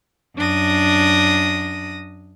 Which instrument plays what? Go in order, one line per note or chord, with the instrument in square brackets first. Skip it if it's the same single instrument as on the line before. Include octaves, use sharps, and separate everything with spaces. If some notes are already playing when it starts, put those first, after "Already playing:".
[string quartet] F#2 D4 D#6 A#6